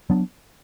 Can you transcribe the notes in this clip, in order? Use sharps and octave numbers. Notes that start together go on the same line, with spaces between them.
F#3 B3 D4